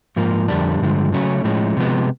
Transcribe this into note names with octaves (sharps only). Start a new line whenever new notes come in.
G#2 F3 A#3
F2 D3 G3 A#3 D4
G2 D3 F3 G#3
C#3 F#3 A3 C#4
A2 F3 G#3 C#4
C3 F3 G#3 B3